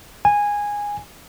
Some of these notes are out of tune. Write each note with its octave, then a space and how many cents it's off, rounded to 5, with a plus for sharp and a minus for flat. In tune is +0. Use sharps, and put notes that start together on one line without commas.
G#5 -15